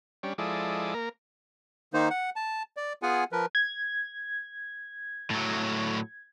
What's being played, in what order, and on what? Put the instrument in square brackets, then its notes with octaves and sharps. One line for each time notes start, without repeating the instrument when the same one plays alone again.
[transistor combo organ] G3 C#4 D4
F3 G#3 E4 A4 D5 D#5
A#3 A#4
[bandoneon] D#3 A#3 D#4 C5
F#5
A5
D5
B3 F4 G#4 F#5 G#5
F3 A#4 B4
[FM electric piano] G#6
[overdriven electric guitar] A2 F#3